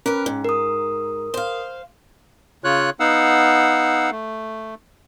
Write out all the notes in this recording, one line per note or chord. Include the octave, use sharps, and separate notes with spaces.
C#4 A#4 B4
G#2
A#4 D#6
C5 F5
C#3 F4 C#5 F#6
B3 D#4 F5 F#5 E6
A3